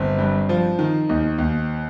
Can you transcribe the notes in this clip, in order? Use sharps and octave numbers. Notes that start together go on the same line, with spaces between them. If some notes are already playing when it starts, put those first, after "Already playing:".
Already playing: G1 C4
G2
F3
D#3
D#2
D#2